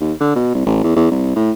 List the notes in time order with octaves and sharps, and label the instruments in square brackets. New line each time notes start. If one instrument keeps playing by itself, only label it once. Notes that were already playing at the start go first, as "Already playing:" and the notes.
[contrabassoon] D#2
D3
B2
C2
A1
E2
E2
C2
A2